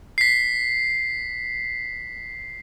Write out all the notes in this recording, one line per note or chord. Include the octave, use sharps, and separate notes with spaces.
B6 C7